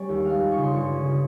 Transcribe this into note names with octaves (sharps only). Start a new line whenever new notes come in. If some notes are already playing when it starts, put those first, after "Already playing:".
Already playing: G3 C#4 C#5
D#2
G#3 F5
F2
C#6
C#3
C6
G1 C#6
C#4
C#3